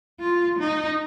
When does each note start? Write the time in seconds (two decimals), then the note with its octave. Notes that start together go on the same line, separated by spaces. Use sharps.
0.20 F4
0.59 D#4